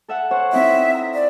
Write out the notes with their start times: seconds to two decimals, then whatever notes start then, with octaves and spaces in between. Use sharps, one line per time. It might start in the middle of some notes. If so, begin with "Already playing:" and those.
0.08 A4 E5 F#5
0.31 C5 C#5 F#5
0.53 C4 D#4 E4 E5
0.94 A#5 E6
1.14 D5